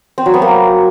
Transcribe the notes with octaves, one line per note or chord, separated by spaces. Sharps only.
C4
F#3
B3
A#3